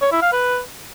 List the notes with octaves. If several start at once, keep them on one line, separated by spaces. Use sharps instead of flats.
C#5
E4
F5
B4